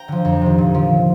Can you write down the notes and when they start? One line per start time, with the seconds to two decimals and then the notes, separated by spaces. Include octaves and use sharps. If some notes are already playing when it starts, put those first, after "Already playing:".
Already playing: G5 A#5
0.08 D3 F3
0.25 F2
0.41 C3 D#3
0.58 A#2
0.75 F3